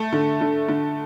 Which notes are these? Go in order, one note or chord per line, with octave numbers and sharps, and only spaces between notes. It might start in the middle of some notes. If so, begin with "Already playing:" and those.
Already playing: A3
D3
D3
D3